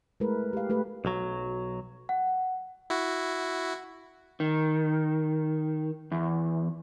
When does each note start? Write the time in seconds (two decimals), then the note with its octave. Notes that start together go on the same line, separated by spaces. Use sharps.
0.20 G#3 A3 E4 G#4 A#4 B4
0.53 G4 F5
0.69 A3 G4 A4 B4
1.05 B1 F#3
2.09 F#5
2.90 E4 F#4
4.40 D#3
6.12 E2